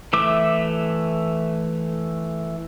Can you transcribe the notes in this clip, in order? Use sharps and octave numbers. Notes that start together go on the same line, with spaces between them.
E3 A3 E5 D6